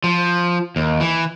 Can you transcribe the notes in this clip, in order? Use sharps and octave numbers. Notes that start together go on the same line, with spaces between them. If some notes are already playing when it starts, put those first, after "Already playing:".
F3
D#2
E3